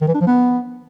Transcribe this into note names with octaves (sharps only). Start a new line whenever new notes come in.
D#3
E3
D4
F3
B3